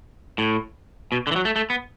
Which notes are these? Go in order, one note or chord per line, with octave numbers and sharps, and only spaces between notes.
A2
B2
D3
E3
F#3
A3
A3
B3